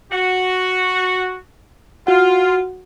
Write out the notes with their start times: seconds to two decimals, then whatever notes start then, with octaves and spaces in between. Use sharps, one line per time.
0.12 F#4
2.07 F4 F#4 F#5